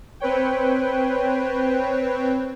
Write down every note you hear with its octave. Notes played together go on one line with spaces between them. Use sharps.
C4 B4 C#5 G5